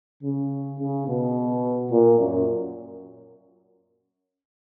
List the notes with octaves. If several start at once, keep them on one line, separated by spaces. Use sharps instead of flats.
C#3
C#3
B2
A#2
F#2